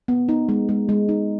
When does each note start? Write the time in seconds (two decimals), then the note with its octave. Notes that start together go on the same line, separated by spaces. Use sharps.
0.08 B3
0.29 D#4
0.49 G#3
0.69 G#3
0.89 G#3
1.09 D#4